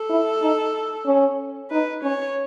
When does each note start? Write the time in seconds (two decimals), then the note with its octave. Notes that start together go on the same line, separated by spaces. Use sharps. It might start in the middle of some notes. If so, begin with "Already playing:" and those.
Already playing: A4
0.10 E4
0.42 D#4
1.06 C#4
1.71 D#4 B4
2.03 C#4 C#5